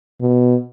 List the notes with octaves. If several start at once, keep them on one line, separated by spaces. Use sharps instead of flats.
B2